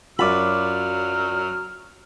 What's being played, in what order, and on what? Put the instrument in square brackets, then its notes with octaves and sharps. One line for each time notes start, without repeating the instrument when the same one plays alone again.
[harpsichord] F#2 B5 [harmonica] F#3 F6 [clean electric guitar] F4 D5